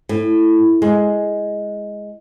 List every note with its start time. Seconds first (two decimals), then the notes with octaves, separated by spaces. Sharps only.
0.09 A2
0.82 G#3